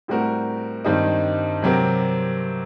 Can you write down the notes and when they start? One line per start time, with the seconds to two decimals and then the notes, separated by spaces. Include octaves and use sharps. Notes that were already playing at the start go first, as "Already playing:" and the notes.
0.08 A2 G3 C4 F#4 A#4
0.85 G2 D#3 G3 C4 D#4
1.62 C3 F#3 C4 G4 A#4